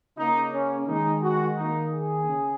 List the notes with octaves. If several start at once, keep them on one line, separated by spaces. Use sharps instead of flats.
C#3 A#3 D#4
C#4
D#3 G#3 D#4
F#4
D#3 A#3 D#4
G#4
C#3